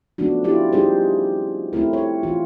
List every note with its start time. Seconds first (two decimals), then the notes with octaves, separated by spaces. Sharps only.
0.18 F3 A3 B3 C#4 D4 F#4
0.44 E4 F4 G4 D5
0.73 G3 C#4 D#4 G4 G#4 C5
1.73 A3 C4 E4 A#4
1.93 C#5
2.23 E3 F4